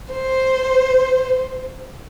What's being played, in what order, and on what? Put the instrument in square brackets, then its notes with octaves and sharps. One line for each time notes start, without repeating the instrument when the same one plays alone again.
[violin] C5